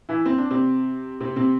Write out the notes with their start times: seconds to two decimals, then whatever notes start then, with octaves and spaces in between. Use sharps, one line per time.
0.09 E3 E4
0.26 C4
0.38 D4
0.51 C3 C4
1.20 C3 C4
1.36 C3 C4